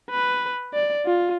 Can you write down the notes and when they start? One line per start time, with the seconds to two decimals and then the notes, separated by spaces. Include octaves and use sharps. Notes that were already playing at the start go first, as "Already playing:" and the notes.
0.11 B4
0.74 D5
1.06 F4